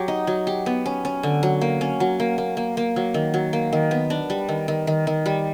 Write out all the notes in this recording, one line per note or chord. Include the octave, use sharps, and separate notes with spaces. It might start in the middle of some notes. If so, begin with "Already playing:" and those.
Already playing: F#3 G4
D#4
F#3
G4
B3
C#4
C#4
D3
F#3
A#3
C#4
F#3
A#3
A#3
A#3
A#3
F#3
D#3
F#3
A#3
D#3
B3
D4
G3
D#3
D#3
D#3
D#3
G3